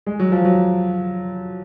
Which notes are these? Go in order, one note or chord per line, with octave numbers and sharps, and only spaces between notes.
G#3
F#3
F3
F#3